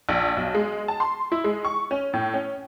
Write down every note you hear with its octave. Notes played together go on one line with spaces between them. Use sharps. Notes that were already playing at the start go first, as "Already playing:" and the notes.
A#1
B1
G#3
A5
C6
E4
G#3
C#6
C#4
A2
C#4